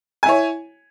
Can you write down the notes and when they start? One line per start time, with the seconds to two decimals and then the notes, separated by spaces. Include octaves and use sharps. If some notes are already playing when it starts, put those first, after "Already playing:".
0.23 G#5
0.26 E4
0.29 C#5